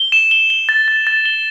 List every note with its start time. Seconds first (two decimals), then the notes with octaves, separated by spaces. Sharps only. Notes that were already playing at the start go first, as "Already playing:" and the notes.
Already playing: G7
0.12 E7
0.31 G7
0.50 G7
0.69 A6
0.88 A6
1.07 A6
1.26 G7